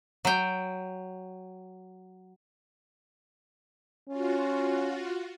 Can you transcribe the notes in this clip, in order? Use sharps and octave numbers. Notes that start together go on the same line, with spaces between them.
F#3 G5
C#4 F4 F#4